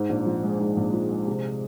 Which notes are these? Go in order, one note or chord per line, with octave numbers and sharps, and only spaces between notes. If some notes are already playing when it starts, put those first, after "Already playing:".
Already playing: G#2
A#1
F3
G#3
G#2
A#1
F3
G#3
C3